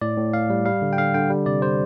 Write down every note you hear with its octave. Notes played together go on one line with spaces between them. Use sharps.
A2 D5
A2
A2 F5
G3
G3 F5
D3
G5
D3 F5
D3 G5
G3
C3 D5
G3 C5